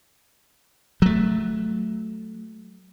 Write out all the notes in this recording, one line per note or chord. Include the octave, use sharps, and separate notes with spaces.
F#3 A3